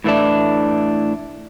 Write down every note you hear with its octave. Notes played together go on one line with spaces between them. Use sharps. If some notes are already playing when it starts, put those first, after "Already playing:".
A2 E3 A3 D4